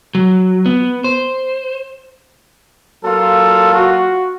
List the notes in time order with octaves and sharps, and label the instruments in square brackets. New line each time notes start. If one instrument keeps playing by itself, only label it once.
[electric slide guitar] F#3
B3
C5
[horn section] F#3 A#3 F4 [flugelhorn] A4
[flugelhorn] F#4